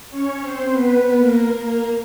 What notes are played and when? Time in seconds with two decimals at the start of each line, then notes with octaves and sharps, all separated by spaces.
0.11 C#4 C#5
0.41 C4 C5
0.71 B3 B4
1.17 A#3 A#4
1.62 A#3 A#4